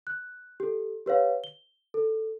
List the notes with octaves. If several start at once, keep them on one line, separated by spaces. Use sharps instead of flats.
F#6
G4 A4
G4 B4 C#5 F5
G7
A4